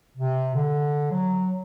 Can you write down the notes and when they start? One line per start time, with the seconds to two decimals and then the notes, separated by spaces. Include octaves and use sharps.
0.17 C3
0.55 D3
1.11 F#3